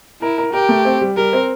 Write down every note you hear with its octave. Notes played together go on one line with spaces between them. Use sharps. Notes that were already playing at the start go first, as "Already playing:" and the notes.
E4 A#4
A#4
G4 A#4
A3
C4
G3
G3 A#4
C4